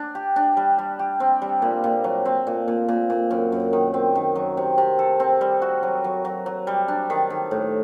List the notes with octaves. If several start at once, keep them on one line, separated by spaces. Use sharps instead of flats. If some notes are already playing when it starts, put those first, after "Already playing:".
Already playing: D4
G4
D4
G3
G3
G4
C4
G3
A#2
A#2
F#3
C4
A#2
A#2
A#2
A#2
F#2
F#2
D#3
C4
D#3
F#3
C3
C3
A4
C4
G3
F#4
F#3
F#3
F#3
F#3
G3
D4
D#3
D#3
A2